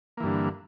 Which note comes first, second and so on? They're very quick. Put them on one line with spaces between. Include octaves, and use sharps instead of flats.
A#3 E3 G2 D3